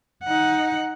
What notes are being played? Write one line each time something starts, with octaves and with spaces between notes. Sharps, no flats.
D#4 F#5